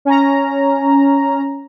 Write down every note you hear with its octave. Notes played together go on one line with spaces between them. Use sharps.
C#4 A#5